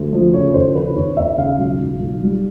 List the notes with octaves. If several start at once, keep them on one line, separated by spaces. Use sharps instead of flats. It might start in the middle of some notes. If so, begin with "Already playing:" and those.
Already playing: D2
F3
C#3 C#5
D#2 C5
C#3 B4
D#2 C#5
D#2 E5
C#3 F5
B1
B1
B1
G3